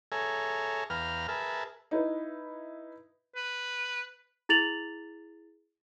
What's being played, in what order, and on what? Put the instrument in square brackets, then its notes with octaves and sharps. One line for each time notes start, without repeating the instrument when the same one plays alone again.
[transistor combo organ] G#4 A4 C#5 E5 G#5 A#5
E2 B4 F5 G5 A#5 F6
G#4 A#4 B4 E5 A5
[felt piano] D#4 E4 B4
[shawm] B4
[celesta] E4 G#4 A6 F7 F#7